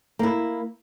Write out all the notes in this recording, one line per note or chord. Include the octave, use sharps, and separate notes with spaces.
A#3 E4